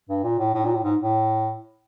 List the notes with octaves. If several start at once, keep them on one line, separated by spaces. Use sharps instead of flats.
G2
A#2
A2
A2
A#2
A2
G#2
A2